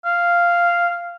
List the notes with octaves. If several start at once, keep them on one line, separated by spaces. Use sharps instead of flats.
F5